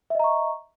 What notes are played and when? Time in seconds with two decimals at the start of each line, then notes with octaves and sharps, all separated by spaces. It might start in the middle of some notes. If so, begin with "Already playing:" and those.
0.10 E5
0.15 D#5
0.20 A#5
0.24 C#6